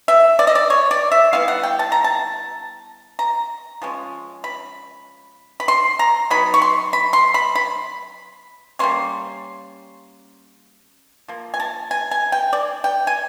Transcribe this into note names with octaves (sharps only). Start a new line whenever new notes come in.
E5
D5
D#5
D5
C#5
D5
E5
G3 B3 E4 F5
F#5
G5
A5
A#5
A5
A#5
F3 G#3 C#4
B5
B5
C6
A#5
F#3 B3 D#4 B5
C#6
C6
B5
C6
B5
B5
G3 A#3 C#4 C6
F3 A#3
G#5
A5
G#5
G#5
G5
D5
G5
G#5